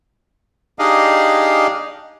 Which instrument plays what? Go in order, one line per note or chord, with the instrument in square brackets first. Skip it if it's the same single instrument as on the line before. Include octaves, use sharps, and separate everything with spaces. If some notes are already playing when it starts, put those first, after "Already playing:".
[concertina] D4 D#4 G4 G#4 D#5 F5